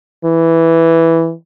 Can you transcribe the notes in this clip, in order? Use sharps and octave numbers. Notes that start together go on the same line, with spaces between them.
E3